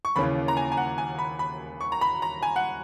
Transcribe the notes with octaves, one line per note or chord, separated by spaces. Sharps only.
C#6
D#2 C#3 E3 A#3 C#4 B5
A#5
G#5
G#5
F#5
G#5
B5
B5
C#6
A#5
B5
A#5
G#5
F#5